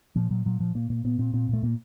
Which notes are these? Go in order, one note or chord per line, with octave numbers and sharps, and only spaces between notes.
A#2 F3
A#2 F#3
A#2 F#3
A#2 F3
A#2 A#3
A#2 A#3
A#2 B3
A#2 C4
A#2 C4
A#2 A3
A#2 A#3